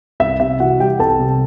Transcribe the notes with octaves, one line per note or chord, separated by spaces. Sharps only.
C2 E5
C3 E5
E3 F#4 F#5
G3 G4 G5
C2 A4 A5
C3